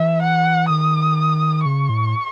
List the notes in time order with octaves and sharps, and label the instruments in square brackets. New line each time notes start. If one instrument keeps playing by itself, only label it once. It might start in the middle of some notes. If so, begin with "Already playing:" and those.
Already playing: [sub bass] E3 [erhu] E5
[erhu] F#5
[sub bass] D#3 [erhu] D#6
[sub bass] C#3 [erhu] C#6
[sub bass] A2